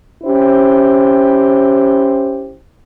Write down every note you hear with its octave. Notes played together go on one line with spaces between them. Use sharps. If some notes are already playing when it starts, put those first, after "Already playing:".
C#4 E4 G4 C5